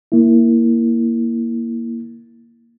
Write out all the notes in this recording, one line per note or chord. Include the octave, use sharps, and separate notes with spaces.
A#3 E4